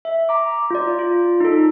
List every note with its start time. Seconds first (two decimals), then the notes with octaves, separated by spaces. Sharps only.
0.05 E5
0.29 A#5 D6
0.71 F4 D5
0.99 F4
1.40 D#4 A4